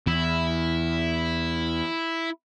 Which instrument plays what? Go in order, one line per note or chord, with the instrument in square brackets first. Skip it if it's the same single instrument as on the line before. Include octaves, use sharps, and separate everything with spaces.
[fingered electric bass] E2 [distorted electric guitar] E4